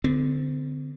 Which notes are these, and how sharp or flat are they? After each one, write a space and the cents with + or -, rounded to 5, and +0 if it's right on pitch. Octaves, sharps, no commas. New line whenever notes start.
D3 +0 C4 -40